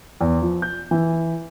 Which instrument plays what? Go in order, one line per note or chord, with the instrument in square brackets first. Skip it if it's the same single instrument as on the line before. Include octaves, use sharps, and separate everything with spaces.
[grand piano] E2
F3
G6
E3